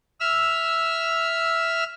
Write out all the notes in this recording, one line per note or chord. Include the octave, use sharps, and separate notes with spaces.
E5 E6 F6